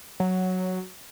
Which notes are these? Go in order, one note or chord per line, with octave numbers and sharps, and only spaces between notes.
F#3